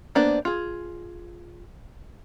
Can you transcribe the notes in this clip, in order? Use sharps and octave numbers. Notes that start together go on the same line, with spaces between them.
A#3 B3 D4 C5 D5
F4 G#4